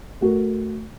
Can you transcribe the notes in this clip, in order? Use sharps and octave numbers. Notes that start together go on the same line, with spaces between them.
A3 F#4 A#4